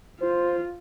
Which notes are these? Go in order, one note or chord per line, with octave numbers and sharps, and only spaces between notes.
F4 C5